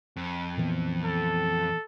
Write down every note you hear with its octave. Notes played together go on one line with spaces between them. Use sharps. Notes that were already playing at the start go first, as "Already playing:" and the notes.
F2
A#2 E3 B3
A4